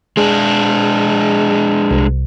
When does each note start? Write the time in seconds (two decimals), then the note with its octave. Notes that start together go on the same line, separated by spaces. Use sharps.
0.17 G#3 D4 G#4
1.91 C2